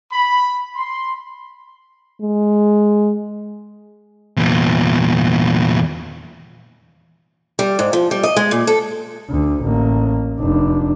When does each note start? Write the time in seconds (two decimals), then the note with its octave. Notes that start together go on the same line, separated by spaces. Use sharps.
0.13 B5
0.76 C6
2.21 G#3
4.37 E2 A#2
7.59 G3
7.79 G#2
7.93 F3
8.11 G3
8.23 D#5
8.36 G#3
8.51 A#2
8.67 A4
9.29 D2
9.63 A1 A#3
10.40 F1 D4